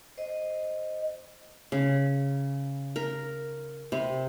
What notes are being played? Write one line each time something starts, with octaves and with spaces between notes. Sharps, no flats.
C5 D#5
C#3
A#4
C3